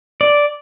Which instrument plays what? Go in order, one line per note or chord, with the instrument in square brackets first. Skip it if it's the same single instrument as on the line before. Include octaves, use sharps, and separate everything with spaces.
[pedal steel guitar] D5